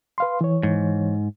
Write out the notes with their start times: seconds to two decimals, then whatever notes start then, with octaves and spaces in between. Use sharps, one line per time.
0.18 B4 F5 C6
0.41 E3 C#5
0.63 G#2